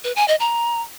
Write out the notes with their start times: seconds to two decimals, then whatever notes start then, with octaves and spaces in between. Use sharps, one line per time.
0.04 B4
0.16 G#5
0.28 D#5
0.40 A#5